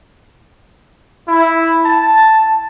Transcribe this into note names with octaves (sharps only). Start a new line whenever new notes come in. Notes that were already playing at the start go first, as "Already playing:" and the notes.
E4
A5